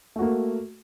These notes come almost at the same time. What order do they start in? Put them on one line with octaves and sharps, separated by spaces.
A3 F#4 A#3